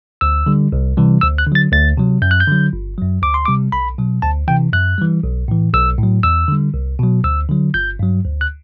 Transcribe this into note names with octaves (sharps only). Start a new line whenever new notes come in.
D2 E6
D3 G3
C2
C3 E3 G3
D2 E6
F#6
D3
F#3 A6
D2 A6
C3 F#3
F#2 G6
F#6
G6
D3 F#3
G1
F#2 F#3
D2 D6
C6
C3 G3 D6
B1 B5
B2 F#3
D2 A5
C3 E3 G5
F#2 F#6
E3 G3
B1
A2 E3
B1 E6
A2 F#3
E2 E6
D3 G3
C2
B2 F#3
D2 E6
D3 F#3
G1 G6
G2 F#3
D2
F#6